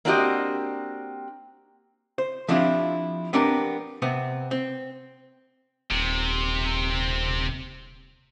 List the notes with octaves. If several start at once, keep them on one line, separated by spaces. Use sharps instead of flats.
A#3 C4 D4 F#4 G4 D#5
C5
F3 C4 D4 E4 F4 G4
B3 C4 D4 G4 A#4
C3 B3 C4
C4
D#1 C3